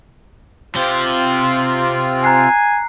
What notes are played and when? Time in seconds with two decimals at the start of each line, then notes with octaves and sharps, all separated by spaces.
0.75 C3 C4 F4 G4
2.24 G#5 A#5 F#6 C7